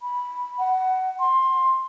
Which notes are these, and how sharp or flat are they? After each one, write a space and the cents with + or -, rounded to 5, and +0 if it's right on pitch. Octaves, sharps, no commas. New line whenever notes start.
B5 -10
F#5 +20
C6 +15